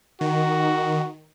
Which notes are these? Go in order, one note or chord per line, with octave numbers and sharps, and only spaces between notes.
D#3 F#4